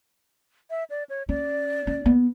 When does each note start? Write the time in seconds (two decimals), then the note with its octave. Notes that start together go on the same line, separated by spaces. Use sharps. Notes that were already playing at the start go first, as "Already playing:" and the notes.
0.70 E5
0.90 D5
1.10 C#5
1.29 C#4 D5
1.87 C#4
2.06 B3